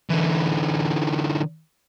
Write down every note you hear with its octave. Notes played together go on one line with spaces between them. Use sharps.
D3 E3